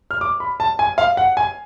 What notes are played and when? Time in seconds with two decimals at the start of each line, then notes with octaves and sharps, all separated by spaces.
0.11 F6
0.21 D6
0.40 B5
0.60 A5
0.79 G#5
0.98 F5
1.17 F#5
1.37 G#5